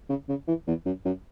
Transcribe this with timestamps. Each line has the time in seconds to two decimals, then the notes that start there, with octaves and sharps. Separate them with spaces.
0.09 C#3
0.29 C#3
0.48 E3
0.67 E2
0.86 F#2
1.05 F#2